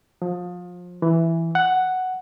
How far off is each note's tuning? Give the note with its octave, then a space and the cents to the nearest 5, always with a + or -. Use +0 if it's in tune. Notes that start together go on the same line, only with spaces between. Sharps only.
F3 +30
E3 +5
F#5 +5